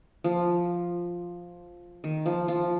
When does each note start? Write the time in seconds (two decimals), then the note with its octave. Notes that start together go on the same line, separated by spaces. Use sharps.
0.24 F3
2.04 D#3
2.26 F3
2.48 F3